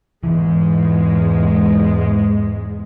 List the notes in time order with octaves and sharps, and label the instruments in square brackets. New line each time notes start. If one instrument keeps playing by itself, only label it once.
[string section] E2 G#2 G#3 [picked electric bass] E3